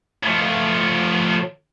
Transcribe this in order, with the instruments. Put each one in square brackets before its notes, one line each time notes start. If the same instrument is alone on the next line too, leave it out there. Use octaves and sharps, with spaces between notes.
[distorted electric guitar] F3 A3